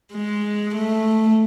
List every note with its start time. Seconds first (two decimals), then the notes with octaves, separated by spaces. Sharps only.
0.13 G#3
0.75 A3